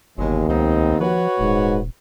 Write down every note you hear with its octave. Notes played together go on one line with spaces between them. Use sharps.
G1 D#2 B2 F#3 G#3
C#2 B3 C4 D#4
F3 F#4 B4 C#5
D#1 G#2